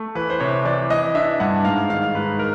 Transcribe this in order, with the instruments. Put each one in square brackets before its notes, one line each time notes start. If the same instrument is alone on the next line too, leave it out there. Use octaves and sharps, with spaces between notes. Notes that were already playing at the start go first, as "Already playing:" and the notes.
Already playing: [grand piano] A3
E3 B4
C5
C3 C#5
E3 D5
E3 D#5
D4 E5
G2 F#5
G#2 F5
D#3 F5
G#2 B4
A#4